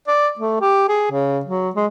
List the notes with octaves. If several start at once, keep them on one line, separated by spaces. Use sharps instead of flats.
D5
A3
G4
G#4
C#3
F#3
G#3